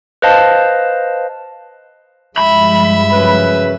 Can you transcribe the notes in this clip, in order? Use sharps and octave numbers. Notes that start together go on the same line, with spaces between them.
B4 C5 D#5 F5 A5
G2 F3 G#3 E5 B5
F#2 C#3 B4